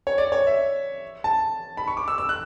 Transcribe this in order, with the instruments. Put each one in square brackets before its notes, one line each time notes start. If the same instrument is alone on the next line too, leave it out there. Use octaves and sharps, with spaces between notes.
[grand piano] C#5
D5
C#5
E5
A5
B5
C#6
D6
E6
E6
F#6